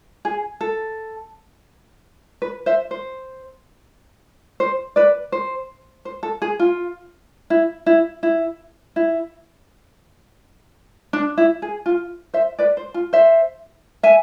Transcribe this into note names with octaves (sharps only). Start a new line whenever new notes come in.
G#4
A4
B4
C5 E5
C5
C5
B4 D5
C5
C5
A4
G#4
F4
E4
E4
E4
E4
D4
E4
G#4
F4
C5 E5
B4 D5
C5
F4
C5 E5
E5 G#5